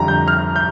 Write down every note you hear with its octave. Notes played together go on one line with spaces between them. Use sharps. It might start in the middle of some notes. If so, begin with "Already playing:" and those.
Already playing: F2 D3 G3 A#5
G6
F6
G6